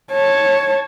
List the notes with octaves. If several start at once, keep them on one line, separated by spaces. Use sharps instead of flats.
C#5 A5